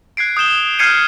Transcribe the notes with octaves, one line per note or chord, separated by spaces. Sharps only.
F#6 G#6 C7 D7
D#6 G6 E7 G7
F6 G6 G#6 C7 C#7 D#7